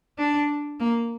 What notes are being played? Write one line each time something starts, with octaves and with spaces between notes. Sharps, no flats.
D4
A#3